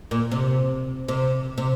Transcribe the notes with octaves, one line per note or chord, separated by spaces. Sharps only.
A#2
C3
C3
C3